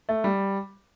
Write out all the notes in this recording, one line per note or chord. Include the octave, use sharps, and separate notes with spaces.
A3
G3